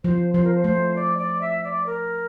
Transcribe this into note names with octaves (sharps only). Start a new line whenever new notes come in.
F3 C5
F3 C5
A#4
C5
A3 C5
D5
D5
E5
D5
A#4